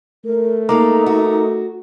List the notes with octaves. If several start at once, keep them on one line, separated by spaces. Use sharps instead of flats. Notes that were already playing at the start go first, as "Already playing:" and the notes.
A3 A#4
G#3 A#3 D#4 A4 A#4 A#5 D6
F#4